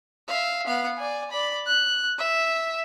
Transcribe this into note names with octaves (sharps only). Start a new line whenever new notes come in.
E5 F5
B3 F5
D5 G#5
D5 B5
F#6
E5